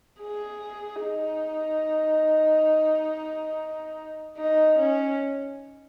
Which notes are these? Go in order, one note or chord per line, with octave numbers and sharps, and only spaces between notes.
G#4
D#4
D#4
C#4